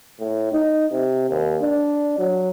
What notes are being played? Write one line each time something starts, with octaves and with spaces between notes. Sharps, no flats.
A2
D#4
C3
D#2
D4
F#3